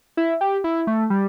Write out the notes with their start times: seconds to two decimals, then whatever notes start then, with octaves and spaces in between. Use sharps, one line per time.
0.17 E4
0.41 G4
0.64 E4
0.87 A3
1.10 G3